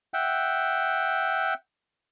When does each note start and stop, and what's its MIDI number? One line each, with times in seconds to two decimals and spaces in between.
0.14 1.54 76
0.14 1.54 78
0.14 1.54 79